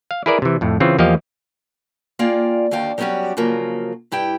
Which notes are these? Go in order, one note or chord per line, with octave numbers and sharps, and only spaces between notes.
F5
E4 G#4 A#4 B4 D5 E5
C3 E3
F2 A2 A3
C#3 E3 C4 F4
E2 F3 A#3 G4 D#5 F5
A#3 F4 G#4 D5 G5
D#2 D3 F#4 F5 G5
F#3 G3 B3 C#4 F#4 G4
C#3 F3 F#3 A#3
G2 E4 G4 G5